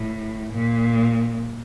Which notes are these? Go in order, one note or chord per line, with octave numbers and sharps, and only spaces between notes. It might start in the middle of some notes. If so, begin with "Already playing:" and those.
Already playing: A2
A#2